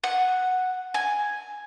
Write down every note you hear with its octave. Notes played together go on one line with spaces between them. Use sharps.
F#5
G#5